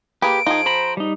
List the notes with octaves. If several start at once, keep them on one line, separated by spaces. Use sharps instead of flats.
A#3 G4 G#4 B4 D7
F3 D#4 G#4
C5 A#5 B5
G3 D#4